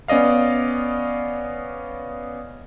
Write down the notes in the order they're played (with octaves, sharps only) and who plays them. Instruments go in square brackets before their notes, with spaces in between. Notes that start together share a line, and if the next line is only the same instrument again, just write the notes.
[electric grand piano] B3 C#4 D5 D#5 F5